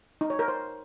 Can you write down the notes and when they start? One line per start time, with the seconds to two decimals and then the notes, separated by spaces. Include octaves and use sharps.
0.21 D#4
0.30 C#5
0.39 A#4
0.48 C5